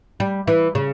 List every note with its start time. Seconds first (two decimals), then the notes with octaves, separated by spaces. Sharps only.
0.20 G3
0.47 E3
0.75 C#3